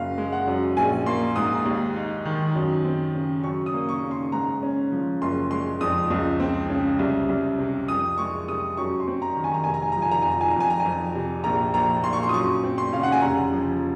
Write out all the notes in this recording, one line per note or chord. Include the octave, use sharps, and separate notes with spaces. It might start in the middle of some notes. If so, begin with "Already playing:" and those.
Already playing: F#1 F#2 F5
G#3
F#5
F#2
A#1 G#5
A#3 C6
G#2 D#6
D#2
D#4
D#3
F#2
C4
C#3
F#2 C#6
D#6
A#3
C#6
C#3
C6
G#2 A#5
C#4
F3
F#1 C6
G#3 C6
F2 D#6
C#2
C4
C#3
C2
C2
C3
F2 D#6
G#3 C#6
C3 D#6
F#2 C#6
C6
C4
A#5
D#3
G#5
A#5
F1 G#5
A#5
G#5
A#5
F3
G#5
A#5
F2 G#5
A#5
G#5
A#5
F2 G#5
A#5
G#5
F2
C3
A#1 A#5
A#1 A#5
A#2 C6
C#6
C6
D#6
F#2 C#6
C4
C6
C#3 F5
F#5
G#5
F1 A#5
F3